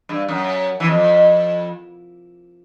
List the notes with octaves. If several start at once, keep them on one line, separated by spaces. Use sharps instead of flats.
G2
F#2
E3
F2